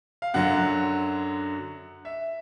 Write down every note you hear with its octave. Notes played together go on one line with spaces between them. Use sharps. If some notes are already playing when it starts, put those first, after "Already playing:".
F5
F#2 D3 F#3 F#5
E5